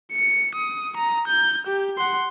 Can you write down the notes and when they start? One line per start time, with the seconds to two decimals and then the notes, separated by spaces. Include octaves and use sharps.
0.13 C#7
0.55 D#6
0.97 A#5
1.28 G6
1.67 G4
1.98 F#5 C6